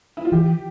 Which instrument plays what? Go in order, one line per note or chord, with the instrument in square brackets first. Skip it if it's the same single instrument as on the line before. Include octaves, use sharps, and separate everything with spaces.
[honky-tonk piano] E4
F4
[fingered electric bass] E3 [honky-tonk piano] G4